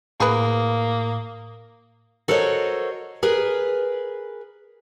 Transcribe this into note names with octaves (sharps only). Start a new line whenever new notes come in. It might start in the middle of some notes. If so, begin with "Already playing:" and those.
A2 A#3 G#4 B4 D#6
F#4 A4 A#4 C5 C#5 D#5
G#4 A#4 B4